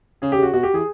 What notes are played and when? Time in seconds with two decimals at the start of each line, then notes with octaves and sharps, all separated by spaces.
0.22 C#3 G#4
0.32 G4
0.38 C#3 F#4
0.53 B2 F#4
0.63 G4
0.74 E3 G#4